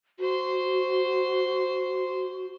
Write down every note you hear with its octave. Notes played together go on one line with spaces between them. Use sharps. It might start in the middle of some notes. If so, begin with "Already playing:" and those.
F#4 C5 C6